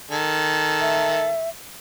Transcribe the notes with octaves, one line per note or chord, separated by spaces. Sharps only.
D#3 A4
E5